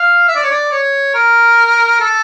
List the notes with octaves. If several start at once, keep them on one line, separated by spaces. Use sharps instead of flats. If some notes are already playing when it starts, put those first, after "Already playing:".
Already playing: F5
E5
D5
C#5
D5
C#5
A#4
A4